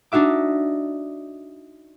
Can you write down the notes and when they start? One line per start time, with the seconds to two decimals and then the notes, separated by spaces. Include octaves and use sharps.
0.12 D4 D#4 F#4 E5 D6